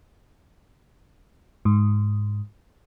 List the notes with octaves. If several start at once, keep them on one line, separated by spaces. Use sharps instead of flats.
G#2